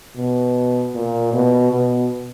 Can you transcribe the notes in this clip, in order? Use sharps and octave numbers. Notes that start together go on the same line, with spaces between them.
B2
A#2
B2
B2